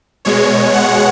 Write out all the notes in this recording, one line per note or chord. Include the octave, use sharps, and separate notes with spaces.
B2 G#3 C#5
F#5